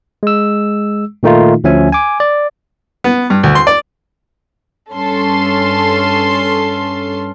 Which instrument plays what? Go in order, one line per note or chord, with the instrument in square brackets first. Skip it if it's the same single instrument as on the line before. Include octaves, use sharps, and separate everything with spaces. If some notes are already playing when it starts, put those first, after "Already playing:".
[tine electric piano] G#3 E6
A#2 D#3 A3 D#4 F4
D2 F3 C#4 E5 G#5
G#5 D6
D5
[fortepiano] B3
G2
D2
C6
D5
[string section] G2 C#4 A4 C6